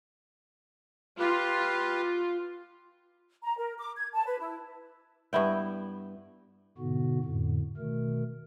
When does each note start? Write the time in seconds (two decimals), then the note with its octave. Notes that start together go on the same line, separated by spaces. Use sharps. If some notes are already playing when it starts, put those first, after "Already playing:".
1.19 F4 G4 B4
3.43 A#5
3.58 A#4
3.78 D6
3.96 G#6
4.13 A5
4.26 B4
4.40 E4
5.33 G2 B3 E4 G5
6.78 G#2 B2 D3 B3 F#4
7.24 F2 A2 D3
7.77 B2 D#3 A3 A#4